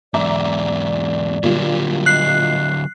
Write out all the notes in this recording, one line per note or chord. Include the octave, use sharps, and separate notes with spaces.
E2 G#2 D5 E5 A#5 D6
A#2 D3 F#3 G3 F4
D#5 F#6 C7